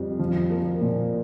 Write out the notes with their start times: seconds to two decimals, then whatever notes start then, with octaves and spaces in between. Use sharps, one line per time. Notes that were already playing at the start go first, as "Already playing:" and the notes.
Already playing: F2 G3
0.19 F3
0.50 A#3
0.81 A#2